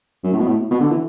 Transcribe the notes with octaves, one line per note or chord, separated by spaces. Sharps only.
F#2
A2
B2
A2
B2
D3
E3